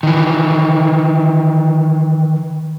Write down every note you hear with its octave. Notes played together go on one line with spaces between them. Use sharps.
D#3 E3